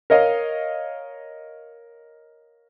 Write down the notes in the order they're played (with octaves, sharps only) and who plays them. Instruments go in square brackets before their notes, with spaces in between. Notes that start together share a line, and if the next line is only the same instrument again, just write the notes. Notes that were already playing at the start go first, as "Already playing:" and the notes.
[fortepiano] A#4 C#5 D#5 F5